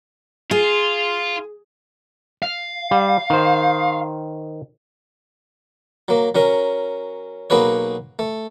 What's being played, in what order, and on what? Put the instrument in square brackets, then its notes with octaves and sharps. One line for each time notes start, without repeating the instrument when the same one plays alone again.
[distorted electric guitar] F4 [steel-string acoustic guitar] G#4
[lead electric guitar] F5
[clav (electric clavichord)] G3
D#3 C5
[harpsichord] F#3 A#3
F#3 C#4 A#4
B1 A#3 F#4 G#4 B4 C#5
A3